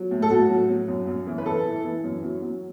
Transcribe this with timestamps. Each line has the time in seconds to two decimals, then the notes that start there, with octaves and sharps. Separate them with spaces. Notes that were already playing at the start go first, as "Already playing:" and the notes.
Already playing: F#3
0.11 A2
0.22 A4
0.30 A2 F#4
0.49 F#3
0.69 F#3
0.88 F#2
1.07 F#2
1.27 E3
1.38 B4
1.46 E3 A4
1.65 E3
1.84 E3
2.04 F#2
2.23 F#3
2.42 F#3